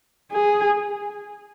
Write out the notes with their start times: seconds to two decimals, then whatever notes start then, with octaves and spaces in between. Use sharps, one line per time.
0.32 G#4